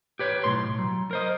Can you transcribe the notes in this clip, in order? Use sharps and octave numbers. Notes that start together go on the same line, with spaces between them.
G4 B4 C#5
B1 A2 C6
F#3
A#4 C5 D#5